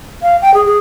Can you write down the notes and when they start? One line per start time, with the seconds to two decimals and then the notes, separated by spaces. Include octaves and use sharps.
0.23 F5
0.42 G5
0.54 G#4
0.66 G#4